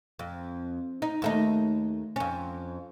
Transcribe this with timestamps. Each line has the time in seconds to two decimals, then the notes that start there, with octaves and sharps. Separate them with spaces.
0.19 F2
1.02 D#4
1.22 D#2 A3 D#4
2.16 F2 C#4